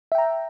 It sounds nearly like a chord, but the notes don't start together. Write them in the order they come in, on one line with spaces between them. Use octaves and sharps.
E5 G5 A#5